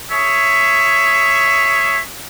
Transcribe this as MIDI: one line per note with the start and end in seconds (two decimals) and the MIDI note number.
0.12 2.01 68
0.12 2.01 73
0.12 2.01 76